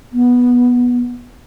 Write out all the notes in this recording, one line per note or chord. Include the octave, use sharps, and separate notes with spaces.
B3